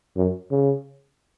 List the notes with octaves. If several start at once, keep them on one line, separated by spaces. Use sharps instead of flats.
F#2
C#3